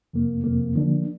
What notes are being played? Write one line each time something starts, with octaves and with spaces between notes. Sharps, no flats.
F2 C3 A#3
F2 C3 A#3
D3 F3 A#3 D4